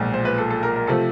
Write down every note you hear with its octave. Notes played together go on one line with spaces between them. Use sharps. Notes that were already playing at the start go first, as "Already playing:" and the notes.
Already playing: B1 A#2 F3 G#3
C5
B4
A4
A4
A#4
A#4
C3 F3 A3 A4